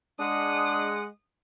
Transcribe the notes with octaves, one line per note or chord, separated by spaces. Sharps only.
G#3 D4 F#5 D#6